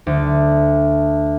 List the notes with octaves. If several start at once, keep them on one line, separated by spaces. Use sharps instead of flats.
D2